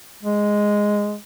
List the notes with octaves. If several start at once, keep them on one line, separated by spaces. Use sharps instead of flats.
G#3